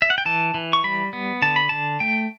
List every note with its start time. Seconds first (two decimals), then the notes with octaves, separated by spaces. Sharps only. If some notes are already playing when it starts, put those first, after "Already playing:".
0.02 E5
0.10 F#5
0.18 G5
0.26 E3 A5
0.54 E3
0.73 C#6
0.84 G3 B5
1.13 B3
1.42 D3 A5
1.56 B5
1.69 D3 A5
2.00 A3 G5